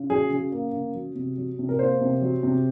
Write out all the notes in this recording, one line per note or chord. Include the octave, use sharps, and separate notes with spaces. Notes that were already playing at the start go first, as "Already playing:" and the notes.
Already playing: C#3
F#3 G#4
C#3
A#3
C#3
F#3
C3
F#3
C3
A#4
A#3 C5
C3
F#3
C3